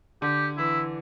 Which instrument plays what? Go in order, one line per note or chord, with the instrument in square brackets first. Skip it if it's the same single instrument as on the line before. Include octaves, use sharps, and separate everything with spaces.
[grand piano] D3 [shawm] G4
[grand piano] E3 [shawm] E4